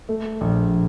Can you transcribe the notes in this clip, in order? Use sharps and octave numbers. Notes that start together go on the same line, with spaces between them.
A3
A#1